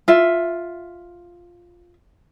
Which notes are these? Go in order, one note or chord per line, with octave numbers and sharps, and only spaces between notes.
F4 E5